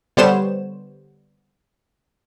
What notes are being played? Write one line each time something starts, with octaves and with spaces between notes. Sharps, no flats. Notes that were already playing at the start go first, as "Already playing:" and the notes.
D3 G3 B3 C5 C#5 E7